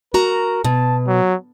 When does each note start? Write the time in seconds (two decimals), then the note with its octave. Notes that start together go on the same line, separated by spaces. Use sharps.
0.14 F#4 A#4 A#5
0.64 B2 A5
1.08 F#3